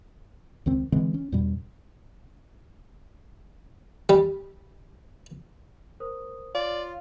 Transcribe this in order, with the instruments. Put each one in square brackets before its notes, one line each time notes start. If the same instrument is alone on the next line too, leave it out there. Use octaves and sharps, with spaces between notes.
[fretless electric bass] C#2 D#3 C4
D3 E3 G#3 C4
C#4
E2 G2 B2 G3
[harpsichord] G3
[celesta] A#4 C5 D#6
[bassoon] F4 [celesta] C#5 F5 [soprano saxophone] D5